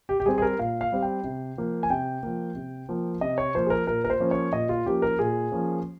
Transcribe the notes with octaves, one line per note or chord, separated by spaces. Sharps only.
G4
G4
G3 C4 G#4
G#4
A#4
A#2 F5
F5
G3 C4
G5
C3
F3 A#3
G#5
C3 G5
F3 A#3
C3
F3 A#3
C3 D#5
C#5
F3 A#3 C5
G#4
A#4
A#2 A#4
A#4
C5
F3 A#3 C#4
C#5
A#2 D#5
F4
F3 A#3 C#4 G4
A#4
A#2 G#4
F3 A#3 C#4